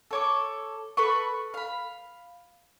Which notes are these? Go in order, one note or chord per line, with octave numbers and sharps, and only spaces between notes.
A4 C#5 D6
A4 B4 B5 C#6
F5 B5